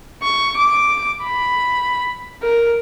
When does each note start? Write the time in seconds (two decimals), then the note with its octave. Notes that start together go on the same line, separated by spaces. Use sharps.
0.23 C#6
0.58 D6
1.24 B5
2.43 A#4